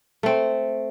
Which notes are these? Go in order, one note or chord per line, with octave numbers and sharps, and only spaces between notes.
A3 C4